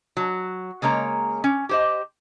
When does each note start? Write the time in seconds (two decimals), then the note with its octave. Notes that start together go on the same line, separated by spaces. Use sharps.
0.17 F#3
0.82 C#3 G#3 A#3 C#5 A#5
1.44 C#4
1.69 G4 C5 D#5